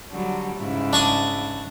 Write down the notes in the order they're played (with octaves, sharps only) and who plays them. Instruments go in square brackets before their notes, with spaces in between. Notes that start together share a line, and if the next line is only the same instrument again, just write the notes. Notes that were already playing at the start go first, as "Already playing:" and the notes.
[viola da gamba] D3 F#3 G3
G#2 C#3 E4
[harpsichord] D4 C#6 D#6